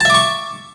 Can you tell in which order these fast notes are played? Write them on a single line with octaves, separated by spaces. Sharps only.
A5 E5 D6 C#6